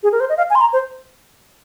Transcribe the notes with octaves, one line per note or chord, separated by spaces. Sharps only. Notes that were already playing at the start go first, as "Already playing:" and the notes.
G#4
A#4
C5
D#5
F5
G#5
C6
A#5
C5